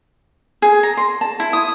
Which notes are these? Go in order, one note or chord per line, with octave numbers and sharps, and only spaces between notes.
G#4
A#5
C6
A5
E4
D#6